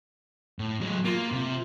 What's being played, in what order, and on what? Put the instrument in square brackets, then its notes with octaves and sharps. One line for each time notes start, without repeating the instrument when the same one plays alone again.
[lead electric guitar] A2
F#3 G#3
[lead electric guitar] A#3 [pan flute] F4
[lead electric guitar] C3